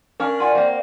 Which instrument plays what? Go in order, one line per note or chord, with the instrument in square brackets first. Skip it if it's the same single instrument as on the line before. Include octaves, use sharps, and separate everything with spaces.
[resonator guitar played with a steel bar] C#4 D4 F5 [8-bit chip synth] A#4
[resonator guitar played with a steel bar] F4 F#5 G#5 [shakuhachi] D5
[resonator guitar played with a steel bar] A#3 C4 [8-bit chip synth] F5